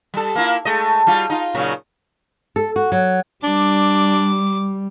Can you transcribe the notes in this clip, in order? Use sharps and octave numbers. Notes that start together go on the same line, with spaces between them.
G3 A4
A#3 E4 F4
G#3 A3 D#5
G3 F4 F#4
D#4 F4
A#2 C#3 F#3
A4
F#4
F#3
G3 D4 D6